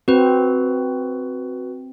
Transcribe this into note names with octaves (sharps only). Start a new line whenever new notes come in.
C4 F#4 B4